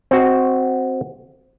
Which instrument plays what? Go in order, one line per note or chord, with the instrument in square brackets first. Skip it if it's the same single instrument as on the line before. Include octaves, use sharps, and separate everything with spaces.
[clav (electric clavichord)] C4 F#4 D#5